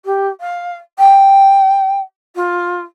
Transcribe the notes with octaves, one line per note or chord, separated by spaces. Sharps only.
G4
F5
G5
F4